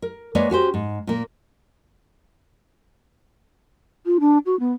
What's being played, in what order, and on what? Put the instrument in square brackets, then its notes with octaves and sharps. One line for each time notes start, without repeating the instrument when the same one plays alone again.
[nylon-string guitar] A#4
G#3 A#3 B4 C#5 D5 F#5
C#4 F#4 G4 C5
G#2
A#2 A#3
[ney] F4
D4
F#4
B3